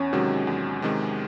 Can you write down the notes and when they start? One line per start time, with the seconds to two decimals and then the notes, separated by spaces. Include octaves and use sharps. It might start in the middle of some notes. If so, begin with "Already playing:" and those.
Already playing: E2 C#4
0.13 C3 D#3 F#3 G#3
0.47 E2
0.82 C3 D#3 G#3